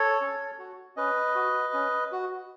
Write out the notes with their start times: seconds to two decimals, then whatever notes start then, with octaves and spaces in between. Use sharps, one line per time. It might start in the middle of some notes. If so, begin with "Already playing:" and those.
Already playing: A4 C#5
0.21 C#4
0.59 F#4
0.96 C#4 B4 D#5
1.35 F#4
1.74 C#4
2.12 F#4